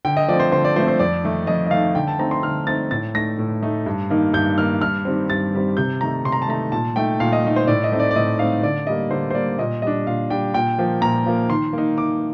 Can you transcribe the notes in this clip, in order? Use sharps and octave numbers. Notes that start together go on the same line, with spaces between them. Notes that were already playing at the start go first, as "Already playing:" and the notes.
D3 G5
D#5
F3 A3 C4 D5
C5
D3 C5
D5
F3 A3 C4 C5
C5
F2 D5
D#3 A3 D#4
F2 D#5
D#5
D#3 A3 D#4 F5
D3 G5
A5
A3 C4 D#4 A#5
C6
D3 F6
A3 C4 D#4 A6
A2 A6
A3 D#4 A#6
A2
A3 D#4
G2
D#3 A#3 D#4
G2 G6
D#3 A#3 D#4 F6
G2 F6
D#3 G3 C4
G2 A6
D#3 G3 C4
C3 G6
D#3 A3 D#4 A#5
C3 C6
A#5
A5
D#3 A3 D#4 A#5
A#2 A5
A3 D#4 G5
A#2 F5
D#5
A3 D#4
C5
A2 D5
D#5
A3 C4 D#4
D5
D5
A2 D#5
A3 C4 D#4 F5
D3 D5
G3 A#3 D#5
D3 C5
C5
G3 A#3 D5
A#2 D#5
G3 D4 D#5
A#2 F5
G3 D4 G5
A#2 G5
F3 A#3
A#2 A#5
F3 A#3
D#3 C6
A#3 D#4
D#3 D6